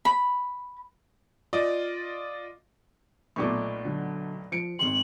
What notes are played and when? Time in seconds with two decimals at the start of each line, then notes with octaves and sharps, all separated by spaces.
0.05 B5
1.53 F4 D5 D#5
3.36 B1 A#2 A3 C#6 D6
3.85 D3 F#3
4.52 F3 C#7 D7
4.79 G#1 D#3 C6 F#7